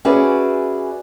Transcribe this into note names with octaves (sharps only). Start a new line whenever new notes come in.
C#4 F#4 G#4 B4 D5 E5